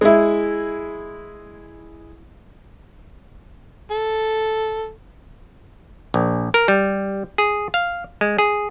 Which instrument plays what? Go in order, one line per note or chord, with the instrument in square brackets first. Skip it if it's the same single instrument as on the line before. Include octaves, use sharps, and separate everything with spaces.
[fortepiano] G#3 E4
[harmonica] A4
[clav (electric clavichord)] A#1
A#4
G3
G#4
F5
G#3
G#4